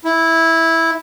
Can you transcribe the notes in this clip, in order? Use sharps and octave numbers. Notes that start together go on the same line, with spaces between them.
E4